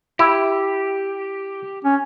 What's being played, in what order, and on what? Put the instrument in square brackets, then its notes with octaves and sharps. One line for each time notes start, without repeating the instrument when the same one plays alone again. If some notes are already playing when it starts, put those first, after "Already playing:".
[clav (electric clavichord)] E4 [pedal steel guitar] G4
[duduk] C#4